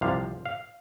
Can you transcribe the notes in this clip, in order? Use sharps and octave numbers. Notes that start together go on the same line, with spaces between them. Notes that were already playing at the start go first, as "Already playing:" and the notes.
C2 C3 F3 F5
F5